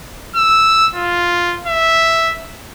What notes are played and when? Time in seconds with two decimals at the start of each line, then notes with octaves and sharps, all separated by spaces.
0.36 E6
0.95 F4
1.67 E5